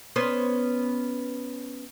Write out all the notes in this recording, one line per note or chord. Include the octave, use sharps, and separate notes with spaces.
B3 C#4 C5